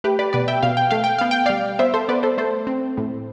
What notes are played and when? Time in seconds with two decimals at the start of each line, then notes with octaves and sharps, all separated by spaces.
0.04 A3 G4 B4
0.19 B4 D5
0.33 B2 B4 D5
0.48 E5 G5
0.63 B2 F5
0.77 G5
0.91 A3 F5
1.04 G5
1.19 B3 F5
1.31 G5
1.46 G3 D5 F5
1.79 B3 C5 E5
1.94 A4 C5
2.08 B3 B4 D5
2.23 A4 C5
2.38 A3 A4 C5
2.67 C4
2.97 A2